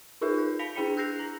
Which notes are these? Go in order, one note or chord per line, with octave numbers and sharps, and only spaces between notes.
D#4 F4 G#4 A#4 B4 E5
G6
F5 B5 A#6 B6 F7
D4 E4 G#4 G5 B5 C#7
E6 F#6 G6 A#6 C7 F7
A#5 A#6